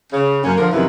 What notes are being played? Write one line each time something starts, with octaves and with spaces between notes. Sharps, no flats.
C#3
F#2 A#3 C#4
D3 F3 A#4
F#2 C3 D#3 F3 E4 B4